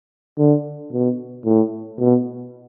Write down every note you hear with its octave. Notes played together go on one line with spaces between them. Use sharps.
D3
B2
A2
B2